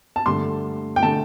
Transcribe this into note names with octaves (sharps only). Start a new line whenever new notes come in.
A5
G2 D3 A3 C6
G5
D3 A3 A5